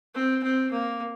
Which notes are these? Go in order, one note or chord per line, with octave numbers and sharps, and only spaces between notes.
C4
C4
A#3